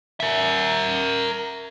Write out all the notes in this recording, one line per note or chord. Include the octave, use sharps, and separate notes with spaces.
A#4 E5